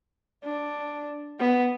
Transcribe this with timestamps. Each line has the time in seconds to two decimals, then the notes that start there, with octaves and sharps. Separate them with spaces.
0.44 D4
1.39 B3